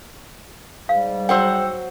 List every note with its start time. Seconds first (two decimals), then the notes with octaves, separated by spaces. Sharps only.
0.89 G#2 G3 F5
1.29 F#3 C5 F#5 G5 E6